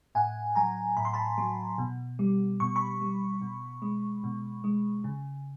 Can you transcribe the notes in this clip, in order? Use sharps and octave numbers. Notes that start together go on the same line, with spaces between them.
A2 F#5 G#5
F#3 G#5 A#5
A2 B5
C6
A5 B5
F#3
B2
G3
B2 C#6
B5 C#6
G3
B2
G#3
B2
G#3
C#3